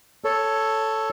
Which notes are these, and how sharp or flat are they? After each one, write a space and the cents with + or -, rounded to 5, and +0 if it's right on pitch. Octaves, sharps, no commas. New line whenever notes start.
A4 +0 C#5 +5